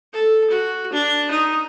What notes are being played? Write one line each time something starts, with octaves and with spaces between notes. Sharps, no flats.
A4
F#4
D4
D#4